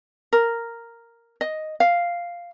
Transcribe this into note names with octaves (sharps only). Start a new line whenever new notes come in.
A#4
D#5
F5